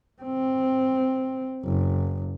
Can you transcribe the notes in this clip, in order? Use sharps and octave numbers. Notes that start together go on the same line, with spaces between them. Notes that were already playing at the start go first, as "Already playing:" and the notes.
C4
F#1